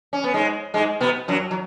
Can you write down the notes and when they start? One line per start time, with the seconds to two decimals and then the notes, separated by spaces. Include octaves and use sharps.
0.13 C#4
0.24 B3
0.34 G#2 G#3
0.74 G#2 G#3
1.01 B2 B3
1.28 F#2 F#3
1.51 F#3